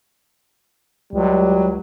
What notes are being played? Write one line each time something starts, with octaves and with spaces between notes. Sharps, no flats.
C#2 F#3 G3